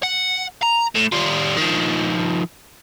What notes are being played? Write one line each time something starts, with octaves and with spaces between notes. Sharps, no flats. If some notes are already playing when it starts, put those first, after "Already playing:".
F#5
A#5
A2
G3 F4
D#3 F3